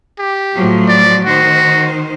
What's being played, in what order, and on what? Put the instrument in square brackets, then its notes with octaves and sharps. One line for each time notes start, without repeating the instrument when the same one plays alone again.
[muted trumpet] G4
[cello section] A2 F3 F#3
[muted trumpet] D5
[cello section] D#3 C5 [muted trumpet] F#4